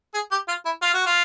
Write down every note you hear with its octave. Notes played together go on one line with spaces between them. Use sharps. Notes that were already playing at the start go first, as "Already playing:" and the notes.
G#4
G4
F4
E4
F4
F#4
F4